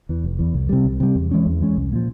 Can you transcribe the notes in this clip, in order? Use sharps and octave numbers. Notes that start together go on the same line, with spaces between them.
E2 E3
F1
E2 E3
C2
C3 G3
C2
C3 G3
E2
E3 G#3 C#4
E2
E3 G#3 C#4
C2
A#2 F3